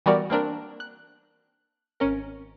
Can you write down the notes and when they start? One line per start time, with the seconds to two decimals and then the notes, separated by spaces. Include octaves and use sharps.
0.06 E3 G3 B3 F#4 A#4 D5
0.30 A#3 C4 D4 A#4
0.80 F#6
2.00 G#1 C#4 A#4